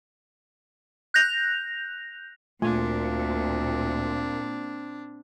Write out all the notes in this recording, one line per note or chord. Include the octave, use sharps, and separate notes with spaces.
F#6 G6 A#6 F7
D2 A#2 A3 C4 D4 F4 G#5